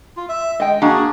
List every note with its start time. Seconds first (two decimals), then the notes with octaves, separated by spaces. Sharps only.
0.17 F4
0.29 E5
0.60 G#3 D#5 G5
0.82 A#3 D4 F#4 G#4